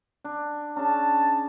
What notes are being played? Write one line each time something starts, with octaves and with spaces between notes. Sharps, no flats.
D4
C#4 D4 G#4 A5